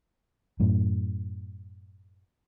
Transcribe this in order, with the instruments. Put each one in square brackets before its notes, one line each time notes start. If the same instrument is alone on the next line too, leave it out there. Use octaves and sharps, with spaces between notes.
[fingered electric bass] F#2 A2